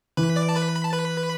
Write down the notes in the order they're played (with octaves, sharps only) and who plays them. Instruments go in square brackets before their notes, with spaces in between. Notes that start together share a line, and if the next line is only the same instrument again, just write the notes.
[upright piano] E3 [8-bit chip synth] B4 B5
[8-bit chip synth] D5 D6
A5
B4 B5
B5
A5
B4 B5